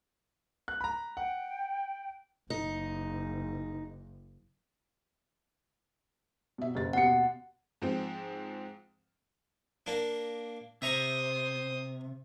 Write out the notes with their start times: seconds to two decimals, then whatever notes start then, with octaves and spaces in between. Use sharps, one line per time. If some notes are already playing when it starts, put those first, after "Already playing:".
0.68 F#6
0.81 A#5 B5
1.17 F#5 G5
2.50 F#1 D#4
6.58 B2 E5
6.75 F#1 A6
6.93 D#2 B2 F#5 C#7
7.82 G#2 F3 C4 G5
9.86 A#3 D4
10.82 C3 C5 E5 A#5 C#6 D#6